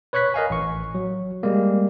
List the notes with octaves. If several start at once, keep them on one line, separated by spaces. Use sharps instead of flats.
B4 C#5 C#6 F#6 B6
A#4 D#5 F5 G#5
A1 C#6
F#3
G3 G#3 A#3